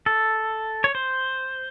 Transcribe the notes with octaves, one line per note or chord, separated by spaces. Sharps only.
A4
C#5
C5